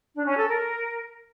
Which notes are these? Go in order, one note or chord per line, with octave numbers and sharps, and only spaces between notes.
D4
C#4
A4
A#4